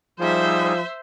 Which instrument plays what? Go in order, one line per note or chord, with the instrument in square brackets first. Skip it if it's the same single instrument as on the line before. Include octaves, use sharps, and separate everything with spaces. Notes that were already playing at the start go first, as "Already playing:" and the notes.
[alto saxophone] F3 [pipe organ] G3 D#4 G#4 [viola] C5 E5